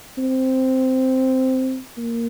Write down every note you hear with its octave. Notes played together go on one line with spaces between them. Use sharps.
C4
A#3